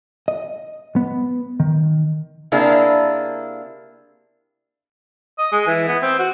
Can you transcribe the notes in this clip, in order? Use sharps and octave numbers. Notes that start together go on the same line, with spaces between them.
D#5
B3
D#3
C3 A#3 D4 E4 G#4
D#5
G#3
E3
B3
C4
F#4